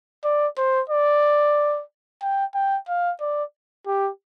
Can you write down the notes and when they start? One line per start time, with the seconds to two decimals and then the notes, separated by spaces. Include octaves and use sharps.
0.24 D5
0.58 C5
0.90 D5
2.22 G5
2.55 G5
2.89 F5
3.21 D5
3.87 G4